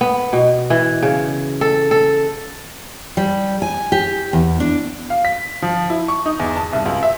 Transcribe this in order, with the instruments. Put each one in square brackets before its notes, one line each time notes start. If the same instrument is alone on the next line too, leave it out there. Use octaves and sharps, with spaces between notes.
[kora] B3
B2
E3
C#3
A4
A4
[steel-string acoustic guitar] G3
G#5
G4
E2
D4
[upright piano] F5
B6
F3
E4
C#6
D#4
E2
A5
C2
C#2
E5